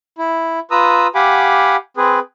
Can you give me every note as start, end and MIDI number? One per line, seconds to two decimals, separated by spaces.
0.18 0.59 64
0.71 1.07 65
0.71 1.07 71
0.71 1.07 82
0.71 1.07 87
0.71 1.07 88
1.15 1.76 67
1.15 1.76 77
1.15 1.76 78
1.15 1.76 80
1.15 1.76 83
1.15 1.76 86
1.97 2.19 60
1.97 2.19 68
1.97 2.19 71